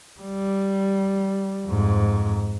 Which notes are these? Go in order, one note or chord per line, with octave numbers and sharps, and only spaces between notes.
G3
F2 G#2